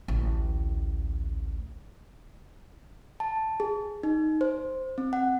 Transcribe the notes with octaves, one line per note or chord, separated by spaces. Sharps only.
A1 D2
A5
G#4
D#4
C5
C4
F#5